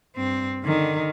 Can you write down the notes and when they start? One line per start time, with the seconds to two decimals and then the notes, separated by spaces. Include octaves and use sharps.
0.16 G2 C4
0.64 D3 D#3